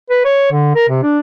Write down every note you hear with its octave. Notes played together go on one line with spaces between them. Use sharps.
B4
C#5
D3
A#4
C3
D4